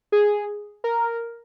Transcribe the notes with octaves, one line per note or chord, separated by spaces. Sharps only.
G#4
A#4